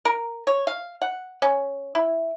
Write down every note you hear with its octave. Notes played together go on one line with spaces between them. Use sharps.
A#4
C#5
F5
F#5
C#4
E4